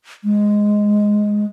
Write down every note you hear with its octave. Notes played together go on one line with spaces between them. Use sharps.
G#3